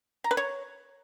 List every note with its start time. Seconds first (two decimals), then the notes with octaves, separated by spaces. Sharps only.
0.24 A#5
0.31 B4
0.37 C#5